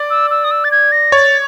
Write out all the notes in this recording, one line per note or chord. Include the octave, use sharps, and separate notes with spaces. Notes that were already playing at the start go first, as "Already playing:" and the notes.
Already playing: D5
E6
E6
D#6
E6
A6
G#6
A#6
C#5 A6